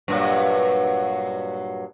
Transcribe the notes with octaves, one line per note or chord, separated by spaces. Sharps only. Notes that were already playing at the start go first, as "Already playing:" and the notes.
G2 A#2 F#3